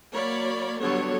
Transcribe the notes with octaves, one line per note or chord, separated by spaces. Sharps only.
F#3 A#3 C#5 D5 B5
D3 F#3 G3 B3 A4 C#5